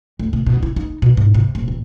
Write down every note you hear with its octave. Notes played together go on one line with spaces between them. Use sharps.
D2
C3
B2
E4
D#4
B2
G#2
C3
D#1
A1